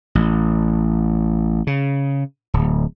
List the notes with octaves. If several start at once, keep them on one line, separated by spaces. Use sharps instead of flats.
A1
C#3
D1